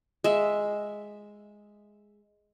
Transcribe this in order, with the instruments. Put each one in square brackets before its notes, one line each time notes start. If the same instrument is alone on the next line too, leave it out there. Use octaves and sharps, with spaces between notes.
[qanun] G#3 E5